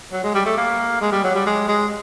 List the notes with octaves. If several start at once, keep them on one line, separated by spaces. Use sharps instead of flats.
F#3
G#3
G3
A3
A#3
G#3
G3
F#3
G3
G#3
G#3